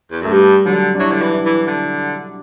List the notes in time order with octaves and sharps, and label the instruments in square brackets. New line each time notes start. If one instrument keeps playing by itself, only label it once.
[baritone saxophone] E2
[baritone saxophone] F#2 [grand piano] A3
[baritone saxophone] G2 [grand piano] G3
[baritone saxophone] D3 [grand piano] F#3
[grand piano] D4
[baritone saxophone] F#3 [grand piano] E4
[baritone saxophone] D3
E3
[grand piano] E4
[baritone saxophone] E3
D3